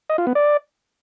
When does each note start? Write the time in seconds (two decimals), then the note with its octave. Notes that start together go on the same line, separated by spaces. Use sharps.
0.10 D#5
0.18 F4
0.27 B3
0.35 D5